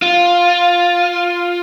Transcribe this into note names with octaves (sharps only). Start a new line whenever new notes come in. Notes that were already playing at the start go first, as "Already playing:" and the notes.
F4